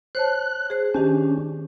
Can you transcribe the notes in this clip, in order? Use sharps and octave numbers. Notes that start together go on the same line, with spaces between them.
C5 C#5 A5 F#6
G#4 C5
D#3 C#4 D4 G4 G6